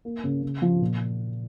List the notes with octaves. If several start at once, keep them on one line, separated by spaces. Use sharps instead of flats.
A#3
C#3
C#3
F3
A#2